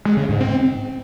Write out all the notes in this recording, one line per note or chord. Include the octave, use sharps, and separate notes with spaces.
G#3
C#3
G#2
C4